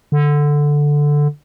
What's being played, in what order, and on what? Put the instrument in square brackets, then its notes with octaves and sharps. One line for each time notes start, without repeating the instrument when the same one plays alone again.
[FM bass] D3